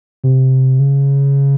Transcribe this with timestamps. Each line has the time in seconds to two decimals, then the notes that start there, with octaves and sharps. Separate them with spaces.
0.24 C3
0.79 C#3